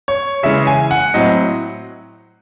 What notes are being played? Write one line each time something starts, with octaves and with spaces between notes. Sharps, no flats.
C#5
C#3 E3 G#3 C#4 E5
G#5
F#5
A2 F#3 C4 D#5